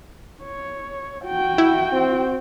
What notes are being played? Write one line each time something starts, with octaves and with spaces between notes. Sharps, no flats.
C#5
F#4 G5
E4
C4